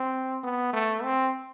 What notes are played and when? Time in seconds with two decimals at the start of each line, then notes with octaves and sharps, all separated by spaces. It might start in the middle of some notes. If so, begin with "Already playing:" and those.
Already playing: C4
0.44 B3
0.74 A3
1.03 C4